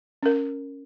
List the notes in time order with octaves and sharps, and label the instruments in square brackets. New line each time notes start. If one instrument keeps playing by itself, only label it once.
[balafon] C#4 A#4